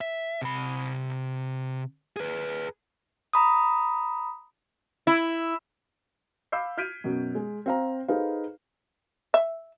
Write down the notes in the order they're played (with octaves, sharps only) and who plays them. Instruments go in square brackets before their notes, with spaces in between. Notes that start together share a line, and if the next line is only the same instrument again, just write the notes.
[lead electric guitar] E5
C3 B5
G#4 B4
[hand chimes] A#5 B5 D#6
[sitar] E4
[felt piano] F5 B5 D6 E6 G6 C7
F6 G6 G#6 B6 D7 D#7
F#2 B2
G#3
C4 C5 F5 G5 A#5
D#4 G#4 A4 B4 C5 F5
[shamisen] E5